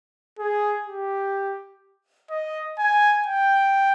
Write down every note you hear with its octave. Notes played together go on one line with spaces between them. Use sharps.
G#4
G4
D#5
G#5
G5